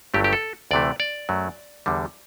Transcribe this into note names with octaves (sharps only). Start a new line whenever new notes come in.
G1 G2 F#3 A3 G4
G4
A4
D2 C3 E3 A3 D5
D5
F#2 F#3 A3
E2 D3 G3